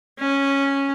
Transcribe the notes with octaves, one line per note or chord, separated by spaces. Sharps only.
C#4